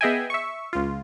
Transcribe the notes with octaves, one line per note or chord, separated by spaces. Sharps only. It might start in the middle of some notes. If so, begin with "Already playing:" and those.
B3 G#4 D#5 E5 G5 G#5
E5 C#6
C#2 F4